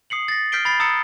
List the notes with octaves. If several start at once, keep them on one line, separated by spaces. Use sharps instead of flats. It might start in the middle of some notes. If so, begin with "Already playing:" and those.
D#6 C7 C#7 F#7
A6 A#6
F6 G6 B6 C7 D7 G7
B5 A6 C7
A#5 D#6 E6 A6 C#7